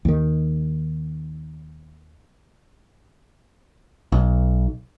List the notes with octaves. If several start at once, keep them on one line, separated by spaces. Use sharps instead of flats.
D#2 D#3
B1